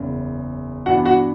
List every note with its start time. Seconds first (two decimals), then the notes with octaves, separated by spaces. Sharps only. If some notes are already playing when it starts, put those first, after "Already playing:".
Already playing: F#1 E2 C#3
0.86 G2 E3 B3 D4 F#4 F#5
1.05 F#4 F#5